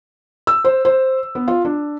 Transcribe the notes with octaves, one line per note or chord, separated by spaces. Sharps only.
E6
C5
C5
B3
F4
D4